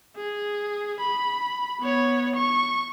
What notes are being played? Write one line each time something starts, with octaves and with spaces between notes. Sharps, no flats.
G#4
B5
B3 C#5
C#6